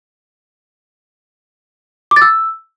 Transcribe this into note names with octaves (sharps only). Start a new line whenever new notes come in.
D6
A6
E6